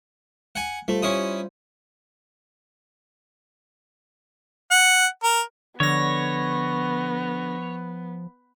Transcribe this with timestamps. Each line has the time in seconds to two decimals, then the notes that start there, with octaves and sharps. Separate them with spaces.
0.55 F#5 G#5
0.88 G3 A3 F4 C5
1.02 C#4 E4 D#6
4.71 F#5
5.23 A#4
5.80 D3 F3 B3 C#5 A#6